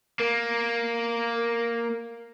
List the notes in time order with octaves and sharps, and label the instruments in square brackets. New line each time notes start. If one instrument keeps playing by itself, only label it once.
[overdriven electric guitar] A#3 [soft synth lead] A#4